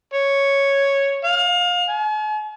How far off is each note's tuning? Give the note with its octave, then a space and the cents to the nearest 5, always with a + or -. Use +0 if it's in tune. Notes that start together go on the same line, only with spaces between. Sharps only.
C#5 +0
F5 +30
G#5 +45